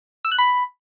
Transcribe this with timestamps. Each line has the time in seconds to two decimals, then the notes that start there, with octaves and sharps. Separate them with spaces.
0.25 E6
0.32 F#6
0.38 B5